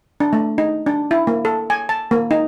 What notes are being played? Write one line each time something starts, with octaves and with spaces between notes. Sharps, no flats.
D4
A3
D#4
D4
E4
A#3
A4
G#5
A5
A#3
D#4